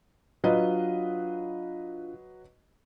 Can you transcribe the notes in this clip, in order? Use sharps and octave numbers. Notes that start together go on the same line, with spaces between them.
F#3 D4 F4 B4 D#5 F5